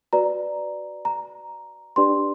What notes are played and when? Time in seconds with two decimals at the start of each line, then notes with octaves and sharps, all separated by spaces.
0.13 F#4 B4 D5 A#5
1.05 A#5
1.96 D4 G4 B4 D5 C6